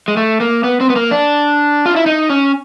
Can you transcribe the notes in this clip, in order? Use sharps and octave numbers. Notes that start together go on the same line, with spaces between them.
G#3
A3
A#3
B3
C4
B3
A#3
D4
F4
E4
D#4
C#4